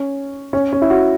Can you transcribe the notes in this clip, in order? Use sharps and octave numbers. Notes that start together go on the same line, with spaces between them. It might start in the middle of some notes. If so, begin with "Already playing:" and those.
Already playing: C#4
C#4
C#4
E4
F#4